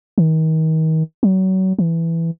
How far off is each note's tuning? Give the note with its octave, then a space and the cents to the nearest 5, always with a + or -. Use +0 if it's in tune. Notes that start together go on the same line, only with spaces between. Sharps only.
D#3 +35
F#3 +30
E3 +5